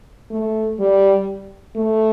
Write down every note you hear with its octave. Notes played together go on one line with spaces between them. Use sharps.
A3
G3
A3